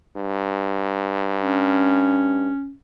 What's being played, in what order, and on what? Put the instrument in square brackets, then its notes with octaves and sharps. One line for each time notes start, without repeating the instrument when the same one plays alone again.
[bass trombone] G2
[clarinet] C#4